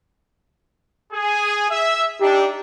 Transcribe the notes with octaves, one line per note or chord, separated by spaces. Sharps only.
G#4
E5
D4 D#4 G4